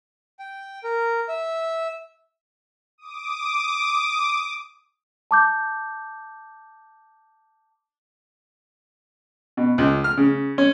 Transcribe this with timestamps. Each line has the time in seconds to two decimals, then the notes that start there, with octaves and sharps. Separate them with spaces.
0.39 G5
0.84 A#4
1.28 E5
2.98 D6 D#6
5.31 A5 D6 G6
9.57 B2
9.78 C#2
10.04 F6
10.17 C#3
10.58 C#4